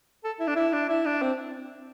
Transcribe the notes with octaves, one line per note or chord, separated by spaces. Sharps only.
A4
E4
D4
E4
D4
E4
D4
C4